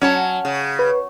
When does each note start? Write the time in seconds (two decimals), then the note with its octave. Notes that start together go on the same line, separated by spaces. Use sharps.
0.02 F#3 C#4 C#5 A5
0.45 C#3
0.79 B4